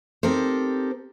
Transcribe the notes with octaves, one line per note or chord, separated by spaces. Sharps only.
C4 D#4 G4 A4 A#4 C5